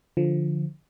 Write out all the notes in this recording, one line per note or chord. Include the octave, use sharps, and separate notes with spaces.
D3 F3